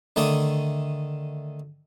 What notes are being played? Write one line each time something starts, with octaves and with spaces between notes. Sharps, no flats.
D3 D#3 A3 D5 G#5 D#6